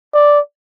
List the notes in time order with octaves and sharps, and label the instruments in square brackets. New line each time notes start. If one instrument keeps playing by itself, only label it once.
[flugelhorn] D5